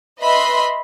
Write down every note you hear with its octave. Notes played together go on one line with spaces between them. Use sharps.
B4 D#5 E5 B5 C6